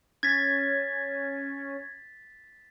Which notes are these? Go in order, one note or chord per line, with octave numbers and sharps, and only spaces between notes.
C#4 G#6 A6 B6